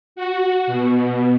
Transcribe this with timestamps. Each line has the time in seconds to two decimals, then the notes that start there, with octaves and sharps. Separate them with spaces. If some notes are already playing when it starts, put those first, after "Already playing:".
0.16 F#4
0.67 B2